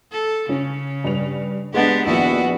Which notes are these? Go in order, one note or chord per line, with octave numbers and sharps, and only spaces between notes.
A4
C#3 C#4
G2 B4 F7
G#3 B3 D4 G4 B4 F#5
A#1 D#2 B3 E4 F#4